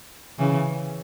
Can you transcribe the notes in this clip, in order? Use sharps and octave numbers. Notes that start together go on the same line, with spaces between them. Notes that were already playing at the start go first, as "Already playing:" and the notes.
C#3 E3